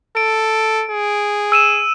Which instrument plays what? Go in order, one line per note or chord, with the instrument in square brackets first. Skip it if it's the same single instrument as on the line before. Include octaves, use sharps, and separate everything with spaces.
[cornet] A4 [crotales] D7
[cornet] G#4
[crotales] E6 D#7 E7